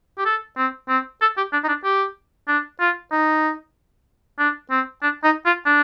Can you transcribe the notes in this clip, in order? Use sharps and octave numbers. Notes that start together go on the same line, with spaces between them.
G4
A4
C4
C4
A4
G4
D4
D#4
D4
G4
D4
F4
D#4
D4
C4
D4
D#4
F4
D4